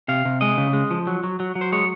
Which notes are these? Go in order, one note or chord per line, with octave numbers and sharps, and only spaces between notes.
C3 F5
C3
G#3 D#5
C#3
G#3
F3
F#3
F#3
F#3
F#3
C5
G#3 C#5